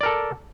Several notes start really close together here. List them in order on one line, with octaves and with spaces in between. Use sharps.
D5 A#4 A4